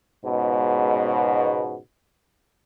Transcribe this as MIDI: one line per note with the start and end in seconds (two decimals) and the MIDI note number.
0.25 1.77 37
0.25 1.77 44
0.25 1.77 47